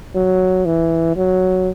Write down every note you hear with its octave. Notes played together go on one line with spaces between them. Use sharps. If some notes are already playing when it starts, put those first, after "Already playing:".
F#3
E3
F#3